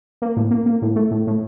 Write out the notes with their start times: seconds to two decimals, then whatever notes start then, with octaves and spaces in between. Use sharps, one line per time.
0.22 A#3
0.37 A2
0.51 A#3
0.66 A#3
0.82 A2
0.96 A3
1.11 A2
1.27 A2